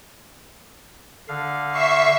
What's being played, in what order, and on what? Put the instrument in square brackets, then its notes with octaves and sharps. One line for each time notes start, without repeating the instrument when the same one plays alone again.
[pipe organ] D3 F5
[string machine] E5 C#6 C7